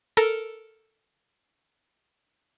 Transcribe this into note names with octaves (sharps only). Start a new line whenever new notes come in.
A4 A#4